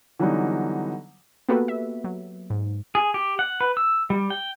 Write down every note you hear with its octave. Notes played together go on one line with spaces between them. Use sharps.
D3 E3 F#3 G3 B3 D#4
A#3 B3 F#4 G4 A4 B4
E5
F#3
G#2
G#4
G4
F#5
B4
E6
G3
G5